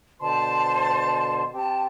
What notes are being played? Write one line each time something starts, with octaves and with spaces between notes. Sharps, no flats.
B2 D3 C5 A5 C6
C4 G4 A5